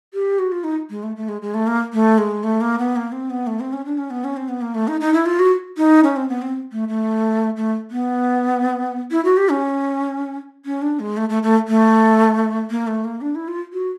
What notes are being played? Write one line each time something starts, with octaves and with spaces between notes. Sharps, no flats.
G4
F#4
F4
D#4
G#3
A3
A3
G#3
G#3
A3
A#3
A3
G#3
A3
A#3
B3
A#3
C4
B3
A3
C4
C#4
D4
C#4
B3
C#4
C4
B3
A#3
A3
D#4
D#4
E4
F4
F#4
D#4
C#4
C4
B3
C4
A3
A3
A3
B3
E4
F#4
G4
C#4
C#4
D4
G#3
A3
A3
A3
A3
A#3
A3
A#3
D4
E4
F4
F#4